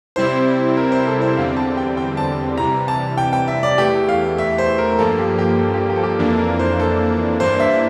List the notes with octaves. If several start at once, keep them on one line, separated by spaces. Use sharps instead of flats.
C3 G3 C4 E4 C5
A#4
C5
A4
C5
E2 D3 G3 C4 F5
A5
G5
G5
A5
C3 E3 G3 A#5
A5
G5
G5
E5
D5
E2 E3 A3 G4
F5
E5
C5
A#4
A#4
G2 F3 A#3 A4
G4
G4
A4
G4
G4
A4
G4
F2 E3 A#3 D4 A4
A#4
C5
A4
G2 E3 A#3 D4 C5
E5